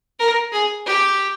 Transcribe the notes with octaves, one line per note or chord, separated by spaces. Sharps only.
A#4
G#4
G4